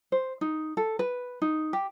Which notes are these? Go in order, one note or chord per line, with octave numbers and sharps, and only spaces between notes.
C5
D#4
A4
B4
D#4
G4